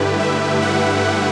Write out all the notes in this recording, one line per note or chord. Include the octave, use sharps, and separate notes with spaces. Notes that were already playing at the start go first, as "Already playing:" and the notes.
Already playing: G2 D3 A3 E4 G4 B4
E5
F#5